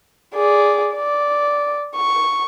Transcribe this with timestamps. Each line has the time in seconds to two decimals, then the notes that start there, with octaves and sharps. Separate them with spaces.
0.35 G#4 D5
0.94 D5
1.95 C#6